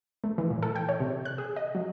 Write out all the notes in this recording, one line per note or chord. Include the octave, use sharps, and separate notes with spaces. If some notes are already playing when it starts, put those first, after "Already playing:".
A3
E3
A#2
A4
G5
C#5
C3
F#6
G#4
D#5
F#3